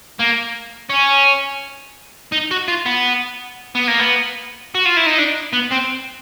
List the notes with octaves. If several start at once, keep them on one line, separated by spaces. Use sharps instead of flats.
A#3
C#4
D#4
F#4
F4
B3
B3
A#3
B3
F#4
F4
E4
D#4
D4
B3
C4